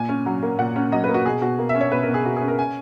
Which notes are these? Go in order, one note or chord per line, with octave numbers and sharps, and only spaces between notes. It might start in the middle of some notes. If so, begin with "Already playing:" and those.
Already playing: A#2 G#5
C#4
F#3
A#3
A#2 F#5
C#4
F#3 D#5
B4
A#3
F#4
B2 G#4
B2 F#4
A#3
E5
C#4
C#5
B2 B4
A#4
B2
G#4
A#3 F#4
G#4
C#4
A#4
G#5